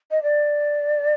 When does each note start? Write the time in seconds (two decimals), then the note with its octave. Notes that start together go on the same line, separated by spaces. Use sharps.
0.11 D#5
0.22 D5